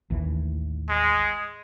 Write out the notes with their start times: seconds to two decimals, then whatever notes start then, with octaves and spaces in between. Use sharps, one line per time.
0.10 A1 D#2 E3
0.89 G#3